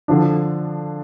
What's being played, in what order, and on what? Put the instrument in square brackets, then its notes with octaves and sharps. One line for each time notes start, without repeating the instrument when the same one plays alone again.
[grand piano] D3 F3 D4